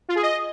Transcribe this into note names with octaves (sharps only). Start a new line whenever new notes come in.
F4
G#4
D#5